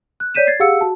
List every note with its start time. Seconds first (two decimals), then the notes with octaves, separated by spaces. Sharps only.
0.20 F#6
0.35 C#5 D5 G6 B6 D#7 E7
0.47 G#6 A6 C7
0.60 G4 G#4 F5 F#5 E6 C#7
0.81 F#4 A5